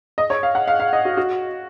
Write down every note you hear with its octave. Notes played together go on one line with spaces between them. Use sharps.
D#5
C#5
F5
F#5
F5
F5
D#5
F#4
F#4